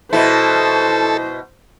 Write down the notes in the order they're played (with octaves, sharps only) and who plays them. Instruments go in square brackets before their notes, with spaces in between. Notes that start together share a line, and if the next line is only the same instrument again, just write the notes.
[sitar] B2 E4 [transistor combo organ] A4 [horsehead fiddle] C5